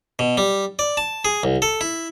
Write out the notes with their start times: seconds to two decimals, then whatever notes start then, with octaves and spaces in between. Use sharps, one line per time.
0.19 B2
0.37 G3
0.79 D5
0.97 A5
1.25 G#4
1.43 C2
1.62 A4
1.81 E4